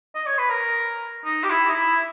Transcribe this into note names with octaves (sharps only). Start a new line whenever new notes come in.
D#5
C#5
B4
A#4
D#4
G4
E4
D#4
E4